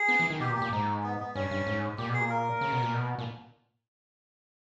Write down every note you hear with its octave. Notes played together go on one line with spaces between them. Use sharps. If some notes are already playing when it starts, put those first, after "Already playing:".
Already playing: G#4
B3
E3
D#3
B2 G4
A#2
G4
A#2
G#2 D#4
B3
B3
G2 C#4
G2
G#2
A#2 G4
B2 G#4
A#2
A#4
C#3
B2
A#2
B2
A#2